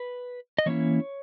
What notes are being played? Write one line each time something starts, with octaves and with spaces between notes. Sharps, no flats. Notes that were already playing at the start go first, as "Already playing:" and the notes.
Already playing: B4
D#5
E3 A#3 C#4 E4 C#5